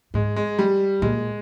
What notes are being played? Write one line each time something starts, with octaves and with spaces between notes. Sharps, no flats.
G#2 G#3
G#3
G3
A#2 G#3